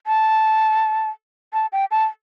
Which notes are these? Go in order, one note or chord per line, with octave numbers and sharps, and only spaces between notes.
A5
A5
G5
A5